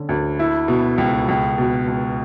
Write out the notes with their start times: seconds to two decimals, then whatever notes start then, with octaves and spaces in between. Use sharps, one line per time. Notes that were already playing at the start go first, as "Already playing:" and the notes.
Already playing: D3 C#4
0.09 D2
0.39 E4
0.68 B2
0.98 C#2
1.28 C#2
1.58 B2
1.88 C#2